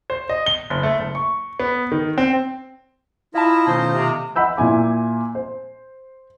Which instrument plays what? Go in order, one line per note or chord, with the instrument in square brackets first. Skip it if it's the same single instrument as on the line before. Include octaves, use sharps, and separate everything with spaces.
[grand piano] C5
D#5
G7
F#1
A3
F#1
C#6
B3
D#3
C4
[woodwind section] E4 [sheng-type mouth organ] F4 D#5 A#5 [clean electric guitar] E5 A5
[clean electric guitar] B2 D#3 A3 [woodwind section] C#4 C5
[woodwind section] C3
[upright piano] D#5 F#5 B5 E6 G6
A#2 E4 G#5 D6
C5